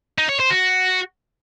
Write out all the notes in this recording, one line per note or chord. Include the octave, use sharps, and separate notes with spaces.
D#4
C#5
C5
F#4